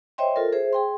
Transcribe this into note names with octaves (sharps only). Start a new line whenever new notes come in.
C5 C#5 D#5 E5 G5 C6
F4 A4 A#4
G#4 C5 E5
G#4 G5 C6